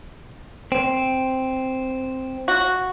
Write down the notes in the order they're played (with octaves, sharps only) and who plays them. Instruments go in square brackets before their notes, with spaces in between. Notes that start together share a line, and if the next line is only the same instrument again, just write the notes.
[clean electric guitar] C4
[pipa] F#4